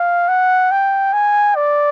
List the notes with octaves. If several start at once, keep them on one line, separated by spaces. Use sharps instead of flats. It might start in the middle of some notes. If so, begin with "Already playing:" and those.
Already playing: F5
F#5
G5
G#5
D5